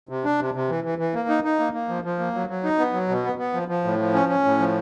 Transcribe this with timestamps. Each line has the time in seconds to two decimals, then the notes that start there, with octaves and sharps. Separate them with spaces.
0.09 C3
0.24 D4
0.39 C3
0.54 C3
0.69 E3
0.84 E3
0.99 E3
1.14 A#3
1.28 D#4
1.44 D#4
1.59 A#3
1.74 A#3
1.89 F3
2.04 F3
2.19 A#3
2.34 F#3
2.49 F#3
2.63 D#4
2.79 B3
2.93 F#3
3.09 B2
3.24 B3
3.38 B3
3.53 F3
3.68 F3
3.84 A2
3.99 F3
4.14 C#4
4.29 C#4
4.44 A2
4.59 F3